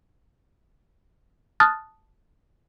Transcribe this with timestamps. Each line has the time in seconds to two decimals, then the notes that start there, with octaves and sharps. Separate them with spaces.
1.60 A5 D#6 F6 F#6 A6